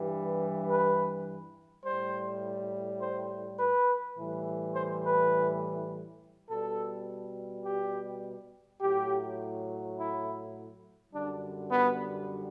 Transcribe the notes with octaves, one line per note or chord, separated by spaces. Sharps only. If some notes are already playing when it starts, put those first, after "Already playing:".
Already playing: G2 E3 G3
B4
A2 G3 C5
C5
B4
A2 E3 G3
C5
B4
B2 G3 A4
G4
A2 F#3 G4
E4
F#2 D3 G3 D4
B3